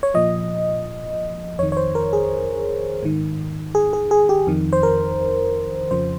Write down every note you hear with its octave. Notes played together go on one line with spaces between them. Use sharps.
C#5
A#2 F3 D#5
F2 D#3 C#5
C#5
C5
A#4
G#4
G#2 D#3
G#4
G#4
G#4
G4
F2 D#3
C5
A#4
F2 C#3 F3 C5